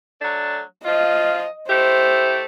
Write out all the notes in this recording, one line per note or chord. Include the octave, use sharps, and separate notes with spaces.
F#3 A3 D4
F3 F4 D#5
A3 E4 G4 C5